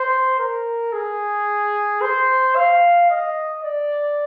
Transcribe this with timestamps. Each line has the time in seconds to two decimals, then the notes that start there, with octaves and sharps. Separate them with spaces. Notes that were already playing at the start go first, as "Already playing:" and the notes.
Already playing: C5
0.39 A#4
0.93 G#4
2.01 C5
2.56 F5
3.10 D#5
3.64 D5